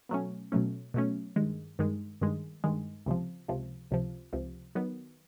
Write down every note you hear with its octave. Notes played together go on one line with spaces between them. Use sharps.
B2 F#3 A3 C#4
B2 F#3 A3 C#4
B2 F#3 A3 C#4
G2 D#3 G#3
G2 D#3 G#3
G2 D#3 G#3
G2 D#3 G#3
C#2 C3 F3
C#2 C3 F3
C#2 C3 F3
C#2 C3 F3
D#3 F#3 B3